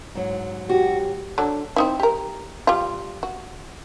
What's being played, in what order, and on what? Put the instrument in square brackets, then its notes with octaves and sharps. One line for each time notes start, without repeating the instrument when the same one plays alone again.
[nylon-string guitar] G#2 F#3
[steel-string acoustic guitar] F#4 [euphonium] G4
[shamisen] D3 F#3 D4
C4 D#4 E4
G4 A#4
G3 F4
F#4